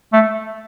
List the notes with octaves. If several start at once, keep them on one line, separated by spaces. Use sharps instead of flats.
A3